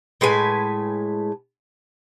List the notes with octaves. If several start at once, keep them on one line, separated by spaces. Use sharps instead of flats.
A2 G#3 B4 G#5